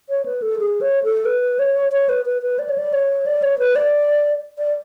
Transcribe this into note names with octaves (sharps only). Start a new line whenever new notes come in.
C#5
B4
A4
G#4
C#5
A4
B4
C#5
C#5
B4
B4
B4
D5
C#5
D5
C#5
D5
C#5
B4
D5
D5